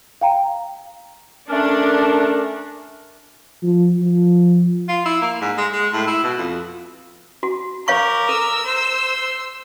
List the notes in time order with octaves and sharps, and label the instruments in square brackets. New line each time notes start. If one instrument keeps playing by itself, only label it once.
[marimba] F5 G5 A#5
[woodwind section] A3 C#4 A#4 [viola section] D4
[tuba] F3
F3
[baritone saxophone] F4
E4
A#3
G#2
G#3
G#3
A2
E4
B2
F2
[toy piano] F#4
[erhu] A#4 [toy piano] C#5 F5 C#6 [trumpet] D6
[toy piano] A4 [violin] E6
[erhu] C5 [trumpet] C6